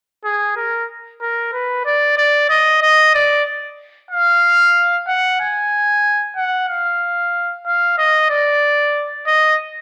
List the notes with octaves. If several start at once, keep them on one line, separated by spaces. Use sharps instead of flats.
G#4
A#4
A#4
B4
D5
D5
D#5
D#5
D5
F5
F#5
G#5
F#5
F5
F5
D#5
D5
D#5